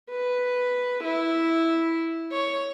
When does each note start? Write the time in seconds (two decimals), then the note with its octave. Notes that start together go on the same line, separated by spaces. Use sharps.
0.10 B4
1.03 E4
2.32 C#5